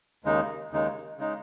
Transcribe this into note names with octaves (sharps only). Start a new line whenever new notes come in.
D#2 C#3 G#3 D#4
D#2 C#3 G#3 D#4
C#3 G#3 D#4